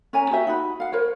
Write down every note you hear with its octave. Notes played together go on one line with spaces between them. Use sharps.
C#4 C#5 G#5 A#5
F#4 G4 E5
D#4 F#4 B5
F5 F#5
A#4 C5 C#5